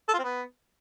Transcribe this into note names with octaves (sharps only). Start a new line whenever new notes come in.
A4
F4
C4
B3